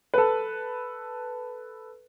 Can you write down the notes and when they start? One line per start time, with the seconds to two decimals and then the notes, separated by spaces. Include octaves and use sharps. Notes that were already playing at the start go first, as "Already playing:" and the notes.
0.14 A4 B4